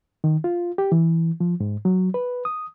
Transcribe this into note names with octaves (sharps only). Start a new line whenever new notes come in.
D#3
F4
G4
E3
F3
G#2
F#3
B4
D#6